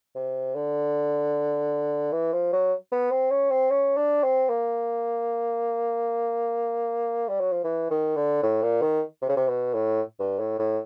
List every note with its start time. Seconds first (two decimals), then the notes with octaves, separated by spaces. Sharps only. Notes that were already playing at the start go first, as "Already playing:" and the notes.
0.15 C3
0.55 D3
2.12 E3
2.33 F3
2.53 F#3
2.91 B3
3.11 C4
3.31 C#4
3.50 C4
3.71 C#4
3.97 D4
4.23 C4
4.49 A#3
7.28 G3
7.40 F#3
7.52 F3
7.64 E3
7.90 D#3
8.16 D3
8.43 A2
8.62 A#2
8.82 D#3
9.21 C3
9.29 C#3
9.36 C3
9.48 B2
9.74 A2
10.19 G2
10.39 A2
10.59 A2